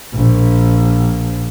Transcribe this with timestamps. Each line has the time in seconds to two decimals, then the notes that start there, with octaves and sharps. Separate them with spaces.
0.14 A#1